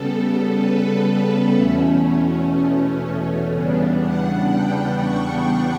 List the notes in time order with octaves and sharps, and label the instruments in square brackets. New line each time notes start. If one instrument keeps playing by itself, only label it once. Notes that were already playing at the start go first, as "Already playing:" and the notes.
Already playing: [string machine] C#3 G3 B3 A4
B4
E2 B2 A3 C#4
E2 C#3 G3 B3 D4
F#5
G5
C#6